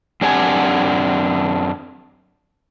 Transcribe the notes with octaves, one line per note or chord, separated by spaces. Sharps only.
F#2 C4 D4 G4 F#5 G#5